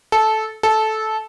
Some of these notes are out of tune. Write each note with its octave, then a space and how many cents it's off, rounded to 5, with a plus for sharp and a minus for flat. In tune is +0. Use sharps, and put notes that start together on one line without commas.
A4 -15
A4 -15